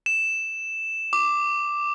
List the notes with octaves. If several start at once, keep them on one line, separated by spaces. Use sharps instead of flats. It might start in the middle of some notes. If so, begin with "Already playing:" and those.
E7
D6